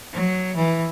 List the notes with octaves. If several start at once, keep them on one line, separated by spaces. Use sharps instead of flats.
F#3
E3